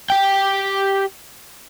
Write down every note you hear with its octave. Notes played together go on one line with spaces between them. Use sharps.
G4 G5